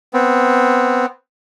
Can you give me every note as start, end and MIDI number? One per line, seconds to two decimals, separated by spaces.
0.13 1.06 59
0.13 1.06 60